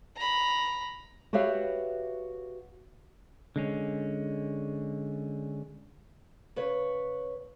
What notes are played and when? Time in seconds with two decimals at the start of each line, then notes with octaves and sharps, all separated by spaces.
0.16 A#5 B5
1.33 F#4 G4 B4 C#5 E5 F5
3.56 D3 G#3 C#4
6.56 C#3 B4 C#5